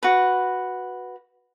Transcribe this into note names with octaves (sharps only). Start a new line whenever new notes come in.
F#4 B4